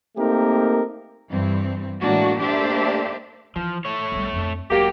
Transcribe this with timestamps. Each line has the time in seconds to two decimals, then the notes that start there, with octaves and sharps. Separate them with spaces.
0.17 A3 A#3 C4 D#4 G4 A#4
1.30 G2 E3 C4
2.00 A2 E3 G#3 A#3 D4 F#4
2.41 A3 A#3 D4 G4 C5 E5
3.56 E3 F3
3.85 A3 C#5
4.12 B1 G3
4.33 F2 D4
4.70 E1 F#3 A#3 G4